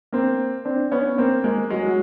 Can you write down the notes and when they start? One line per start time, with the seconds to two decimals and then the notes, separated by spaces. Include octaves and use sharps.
0.13 A#3 C4
0.65 C4 D4
0.92 B3 C#4
1.18 A#3 C4
1.44 G#3 A#3
1.70 F#3 G#3
1.86 F#3